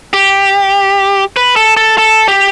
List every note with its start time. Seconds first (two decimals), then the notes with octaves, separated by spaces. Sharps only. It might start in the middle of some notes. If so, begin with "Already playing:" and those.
0.13 G4
1.36 B4
1.56 A4
1.77 A4
1.98 A4
2.28 G4